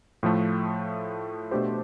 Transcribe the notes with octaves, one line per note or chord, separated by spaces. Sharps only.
A2 F3 A3
B2 A3 D4 G4 C5